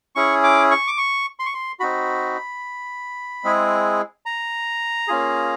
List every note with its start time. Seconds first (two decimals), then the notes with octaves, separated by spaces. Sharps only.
0.15 C#4 E4 G#4 C#6
0.44 D6
0.71 C#6
0.87 D6
0.97 C#6
1.40 C6
1.46 C#6
1.54 C6
1.80 C4 D#4 F#4 B5
3.44 G#3 C4 E4 G#4
4.26 A#5
5.08 A#3 C#4 F4 G#4